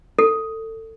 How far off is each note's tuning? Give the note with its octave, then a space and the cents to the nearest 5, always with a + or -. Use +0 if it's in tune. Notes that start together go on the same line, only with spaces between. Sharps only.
A4 +25